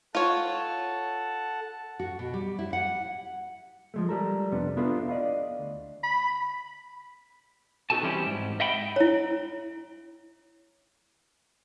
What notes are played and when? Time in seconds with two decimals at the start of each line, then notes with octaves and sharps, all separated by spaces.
0.15 F4 A4 C#5 F#5 A5
2.00 F#4
2.19 B2
2.34 G3
2.59 E4
2.73 F#5
3.94 F3 G#3 A3
4.09 G3 A4 A#4
4.52 F2 C3 B3 D4
4.77 B3 D4 E4 F4 A4 B4
5.09 D5 D#5 F5
5.59 D2
6.03 B5
7.90 B3 D#4 F#4 A4 G#5 A5
8.03 E3 G3 C4 C#4 E4 G4
8.26 G#2
8.60 D#5 E5 F#5 G5 B5
8.96 E4 C#5